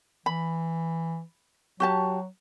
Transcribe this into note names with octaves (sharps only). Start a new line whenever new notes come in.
E3 B5
F#3 F#4 G4 A5